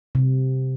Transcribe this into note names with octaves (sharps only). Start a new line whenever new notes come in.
C3